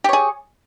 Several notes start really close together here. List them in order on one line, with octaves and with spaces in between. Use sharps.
G4 C#5 G#4